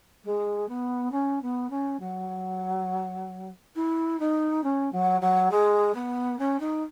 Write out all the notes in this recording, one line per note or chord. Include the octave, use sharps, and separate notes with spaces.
G#3
B3
C#4
B3
C#4
F#3
E4
D#4
C#4
F#3
F#3
G#3
B3
C#4
D#4